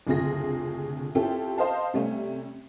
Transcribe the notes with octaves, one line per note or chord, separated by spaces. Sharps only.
F#1 D2 C3 F4 G#4 A#6
C4 C#4 E4 F4 G4 A4
C5 D#5 F5 A5
C3 G3 A3 C#4